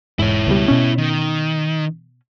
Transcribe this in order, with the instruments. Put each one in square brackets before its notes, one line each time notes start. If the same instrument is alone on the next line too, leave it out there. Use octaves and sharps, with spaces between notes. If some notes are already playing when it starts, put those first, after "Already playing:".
[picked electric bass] E1 G#2 [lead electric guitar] E4 C#5
[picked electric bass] C#2 B2 G3
B2 C#4
[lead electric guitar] D#3